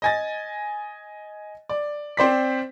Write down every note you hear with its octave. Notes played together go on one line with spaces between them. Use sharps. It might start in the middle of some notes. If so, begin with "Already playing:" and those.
D#5 G#5 A6
D5
C4 C5 D5 B6